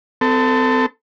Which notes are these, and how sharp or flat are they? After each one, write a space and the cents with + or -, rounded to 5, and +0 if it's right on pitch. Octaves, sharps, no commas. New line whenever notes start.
C4 -40 A4 +20